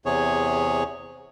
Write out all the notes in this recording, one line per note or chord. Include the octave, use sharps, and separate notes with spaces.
E2 C3 G#4 C#5